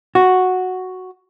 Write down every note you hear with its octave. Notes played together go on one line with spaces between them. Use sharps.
F#4